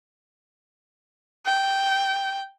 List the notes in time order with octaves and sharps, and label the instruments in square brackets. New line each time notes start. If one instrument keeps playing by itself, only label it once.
[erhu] G5